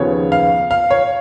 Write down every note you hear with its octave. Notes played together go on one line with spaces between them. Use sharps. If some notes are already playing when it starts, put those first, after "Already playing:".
Already playing: D#2 C#3 F3 B3 C#5
F5
F5
C#5